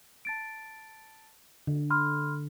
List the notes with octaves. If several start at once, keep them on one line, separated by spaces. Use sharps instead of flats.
A5 A6 D7
D3
B5 C6 F6